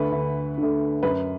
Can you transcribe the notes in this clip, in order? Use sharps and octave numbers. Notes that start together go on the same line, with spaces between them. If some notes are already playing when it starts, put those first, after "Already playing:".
Already playing: D2 D3 A3 B4
D2
D3
A3
F#2 B4